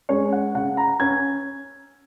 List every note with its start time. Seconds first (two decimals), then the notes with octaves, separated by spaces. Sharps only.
0.09 G#3 C#4 C#5
0.32 F#5
0.55 C#3 F#5
0.77 A#5
1.00 C#4 G#6